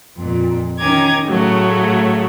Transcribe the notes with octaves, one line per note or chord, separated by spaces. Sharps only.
F2 A#2
D#3 C#4 G#5 A#5 D6 G#6
A2 C#3 F#3 A3